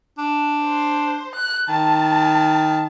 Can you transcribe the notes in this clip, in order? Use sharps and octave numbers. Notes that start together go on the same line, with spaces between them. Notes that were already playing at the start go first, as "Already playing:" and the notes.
D4
C5
F#6
D#3 A5